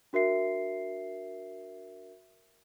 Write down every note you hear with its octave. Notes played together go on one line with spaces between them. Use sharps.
D4 F#4 A#4 E5 C7